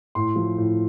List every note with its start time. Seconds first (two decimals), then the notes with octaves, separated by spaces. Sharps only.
0.15 A2 C6
0.36 F3
0.57 A2